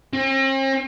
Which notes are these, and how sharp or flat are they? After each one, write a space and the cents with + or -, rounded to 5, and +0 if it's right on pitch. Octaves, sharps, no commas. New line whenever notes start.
C4 +45